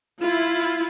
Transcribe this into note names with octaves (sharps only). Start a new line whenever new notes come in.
E4 F4